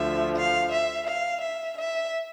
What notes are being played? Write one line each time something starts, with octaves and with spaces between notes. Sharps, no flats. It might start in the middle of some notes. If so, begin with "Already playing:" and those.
Already playing: D2 D3 F3 E5
F5
E5
F5
E5
E5